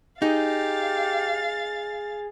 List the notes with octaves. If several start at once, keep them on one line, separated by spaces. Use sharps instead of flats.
D#4 G4 G#4 F5 A6